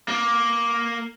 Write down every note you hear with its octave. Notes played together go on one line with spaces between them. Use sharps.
A#3